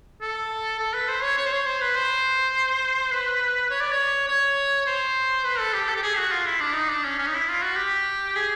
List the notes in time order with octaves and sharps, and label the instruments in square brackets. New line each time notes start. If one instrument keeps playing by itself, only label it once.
[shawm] A4
A4
B4
C5
C#5
C#5
C5
C#5
C5
B4
C5
B4
C#5
D5
C#5
C#5
C5
B4
A4
G4
A4
G4
G#4
F#4
F4
E4
D4
D#4
D4
C#4
C#4
D#4
E4
F4
F#4
G4
G#4